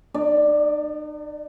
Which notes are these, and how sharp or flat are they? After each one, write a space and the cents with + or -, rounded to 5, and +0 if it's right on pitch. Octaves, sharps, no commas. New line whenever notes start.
D#4 -45 D5 +10